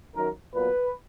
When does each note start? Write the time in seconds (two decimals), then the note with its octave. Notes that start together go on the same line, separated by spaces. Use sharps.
0.14 F#2 D#3 F#3 A#4
0.54 A#2 F#3 B3 B4